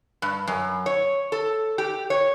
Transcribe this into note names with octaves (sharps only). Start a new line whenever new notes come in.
G2
F#2
C#5
A4
G4
C#5